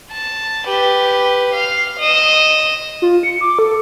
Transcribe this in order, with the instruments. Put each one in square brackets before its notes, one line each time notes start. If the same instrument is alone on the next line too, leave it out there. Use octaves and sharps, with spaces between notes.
[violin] A5
G4 B4
F5
D#5 E7
[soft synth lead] F4
C#7
D6
A4